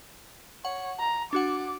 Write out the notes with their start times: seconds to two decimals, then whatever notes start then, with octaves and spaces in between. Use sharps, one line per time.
0.65 C#5 F#5
1.00 A#5
1.33 D4 F#4 F#5 D6